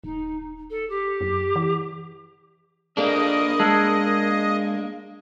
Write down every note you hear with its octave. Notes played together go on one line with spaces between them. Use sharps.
D#1 D#4
A4
G4
F#2
E3
A#3 D4 G#4 A4 D5 D#5
G#3 A5 E6 F#7